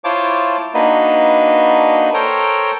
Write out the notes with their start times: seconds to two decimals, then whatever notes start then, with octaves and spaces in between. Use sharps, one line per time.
0.04 E4 F4 C5 C#5 A5 D6
0.74 A#3 D4 D#4 F#4 B4 D#5
2.14 A4 A#4 C5 C#5 G5 A#5